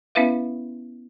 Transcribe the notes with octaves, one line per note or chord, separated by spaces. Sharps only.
B3 C#4 E4 B4 E5 F5